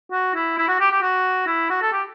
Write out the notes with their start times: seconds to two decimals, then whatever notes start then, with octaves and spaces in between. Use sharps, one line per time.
0.12 F#4
0.35 E4
0.58 E4
0.68 F#4
0.80 G4
0.91 G4
1.02 F#4
1.47 E4
1.70 F#4
1.82 A4
1.92 G4